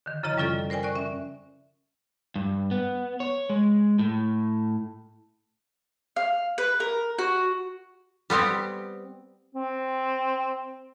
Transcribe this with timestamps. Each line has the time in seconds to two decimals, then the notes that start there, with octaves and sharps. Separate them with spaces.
0.06 D3 D#3
0.23 F#2 C#3 F3 E4 D#5 A#5
0.38 G3 C#4 F4 A4 D5
0.70 A#4 C5 D5 G5 G#5
0.83 D5 C#6 F#6
0.95 C#4 E5
2.36 G2
2.71 B3
3.20 C#5
3.50 G#3
3.99 A2
6.16 F5
6.58 B4
6.80 A#4
7.19 F#4
8.30 G3 B3 C4 G4
9.55 C4